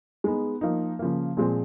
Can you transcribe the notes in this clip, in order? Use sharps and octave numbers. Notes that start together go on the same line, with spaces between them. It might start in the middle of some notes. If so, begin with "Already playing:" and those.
G#3 B3 D#4
F3 A#3 D#4
C#3 F3 A#3
A#2 F3 G#3 C4